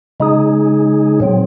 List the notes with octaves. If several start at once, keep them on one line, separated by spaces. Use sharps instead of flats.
C#3 G#3 D#4 G#4
A#2 F#3 C4